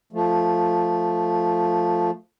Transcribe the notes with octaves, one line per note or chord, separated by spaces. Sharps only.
F3 A3